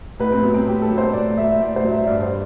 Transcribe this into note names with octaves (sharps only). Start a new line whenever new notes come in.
A2 B4
C4
F#3 B3
C4
A2 G4
A4
F#3
C5
A2 D5
F#3 E5
A2 D5
C5
F#3
E5
G2 D5
C5